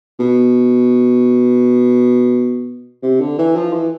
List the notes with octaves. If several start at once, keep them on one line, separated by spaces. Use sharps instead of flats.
B2
C3
D3
E3
F3
E3